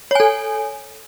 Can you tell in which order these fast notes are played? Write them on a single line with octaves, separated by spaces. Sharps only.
C#5 G#5 A4